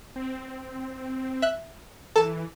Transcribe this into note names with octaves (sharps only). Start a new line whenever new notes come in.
C4
E5 F#6
E3 A4 A5